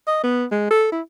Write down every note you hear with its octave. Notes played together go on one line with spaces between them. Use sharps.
D#5
B3
G#3
A4
E4